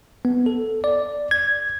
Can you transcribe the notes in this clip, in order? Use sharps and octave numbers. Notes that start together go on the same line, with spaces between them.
B3
A4
D5
G#6